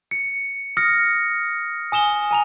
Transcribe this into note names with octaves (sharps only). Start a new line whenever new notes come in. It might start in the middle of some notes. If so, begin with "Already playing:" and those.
C#7
D#6 F6 A#6 C#7
G#5 D#6 E7 G7
G#5 A#5 F7